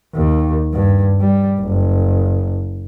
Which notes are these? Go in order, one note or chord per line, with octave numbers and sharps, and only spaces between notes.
D#2
G2
G3
F#1